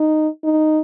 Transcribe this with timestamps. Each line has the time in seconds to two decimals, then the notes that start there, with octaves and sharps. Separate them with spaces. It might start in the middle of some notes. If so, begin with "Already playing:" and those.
Already playing: D#4
0.44 D#4